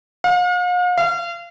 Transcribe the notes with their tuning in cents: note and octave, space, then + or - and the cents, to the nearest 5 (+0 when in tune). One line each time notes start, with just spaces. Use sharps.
F5 +45
F5 -30